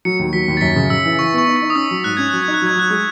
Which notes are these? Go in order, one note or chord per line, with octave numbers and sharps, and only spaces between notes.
F#3 C#7
D#2
F#3 B6
D#2
A6
F#2 B6
C#3
C#3 E6
E3
E3 C#6
B3 C#6
D#4
C#6
D#4
D#6
C#4 E6
F#3
G#2 F#6
C#4 G#6
F#3 F#6
G#6
D#4
F#6
F#3
G#6
F#3 F#6
G#3